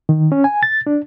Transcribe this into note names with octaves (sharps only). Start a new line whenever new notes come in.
D#3
C#4
G#5
A6
D4